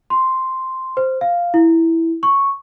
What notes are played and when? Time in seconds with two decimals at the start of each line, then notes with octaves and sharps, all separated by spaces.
0.10 C6
0.97 C5
1.21 F5
1.54 E4
2.23 C#6